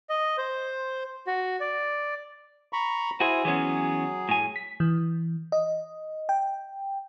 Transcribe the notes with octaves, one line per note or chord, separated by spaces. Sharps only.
D#5
C5
F#4
D5
A#5 B5 C#6
E4 F#4 G#4 C5
E3 F#3 B3 C#4 G#4
A2 G#5
B6
E3
D#5
G5